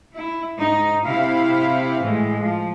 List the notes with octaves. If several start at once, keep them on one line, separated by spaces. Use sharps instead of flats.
E4
G#2 D#4
C3 E4 G4 F5
A2 E3 G#3
F3